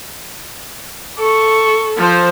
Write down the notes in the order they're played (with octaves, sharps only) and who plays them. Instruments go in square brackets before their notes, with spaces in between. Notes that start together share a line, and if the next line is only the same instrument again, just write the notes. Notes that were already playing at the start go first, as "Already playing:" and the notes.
[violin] A4 [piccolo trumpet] C#6
[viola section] F3 C5 [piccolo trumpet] A4